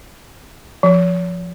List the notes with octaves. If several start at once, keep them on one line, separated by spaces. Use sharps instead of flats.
F3